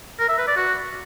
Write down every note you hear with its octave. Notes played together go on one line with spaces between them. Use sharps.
A#4
E5
B4
D5
F#4